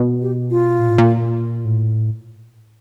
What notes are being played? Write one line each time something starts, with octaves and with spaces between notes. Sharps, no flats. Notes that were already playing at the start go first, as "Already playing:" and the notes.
Already playing: B2
G4
F4
A#2
A2
A#2
A2